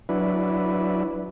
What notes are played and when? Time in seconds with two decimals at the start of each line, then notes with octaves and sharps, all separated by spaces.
0.09 F#3 D4 E4 B4